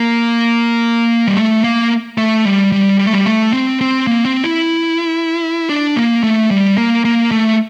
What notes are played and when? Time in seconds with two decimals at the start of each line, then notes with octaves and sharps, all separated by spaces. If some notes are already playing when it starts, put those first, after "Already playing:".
Already playing: A#3
1.28 G3
1.37 A3
1.64 A#3
2.18 A3
2.45 G3
2.72 G3
2.99 G3
3.07 A3
3.13 G3
3.26 A3
3.53 C4
3.81 C4
4.07 A#3
4.25 C4
4.44 E4
5.69 D4
5.96 A#3
6.23 A3
6.51 G3
6.78 A#3
7.05 A#3
7.31 A3